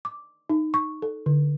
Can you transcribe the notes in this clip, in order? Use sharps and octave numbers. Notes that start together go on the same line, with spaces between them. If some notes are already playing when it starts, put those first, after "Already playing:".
D6
D#4
C#6
A4
D3